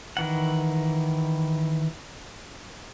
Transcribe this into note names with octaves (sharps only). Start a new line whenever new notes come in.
D#3 E3 F#5